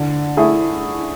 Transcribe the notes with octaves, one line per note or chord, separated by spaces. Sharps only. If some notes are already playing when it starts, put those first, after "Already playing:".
Already playing: D3
A3 E4 G#4